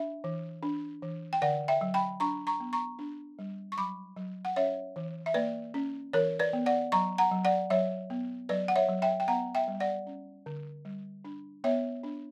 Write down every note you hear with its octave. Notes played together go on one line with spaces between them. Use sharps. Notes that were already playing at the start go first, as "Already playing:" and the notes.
Already playing: D4 E5
E3
D4
E3
G5
D3 D5 F#5
E5 G5
F#3
G5 B5
D4 A#5 C#6
A#5 C#6
B3
A#5 C#6
D4
G3
C#6
F#3 B5 D6
F#3
F#5
C#4 C#5 E5
E3
E5
A#3 B4 D5
C#4
E3 A#4 C#5
B4 D5
B3
D5 F#5
F#3 A#5 C#6
F#5 A#5
F#3
D5 F#5
F#3 C#5 E5
B3
F#3 B4 D5
F#5
C#5 E5
F#3
E5 G5
G5
B3 F#5 A#5
E5 G5
G3
D5 F#5
C#4
D3
G3
D4
B3 C#5 E5
D4